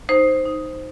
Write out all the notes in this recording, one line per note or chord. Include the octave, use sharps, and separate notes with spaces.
D#4 C5
D#4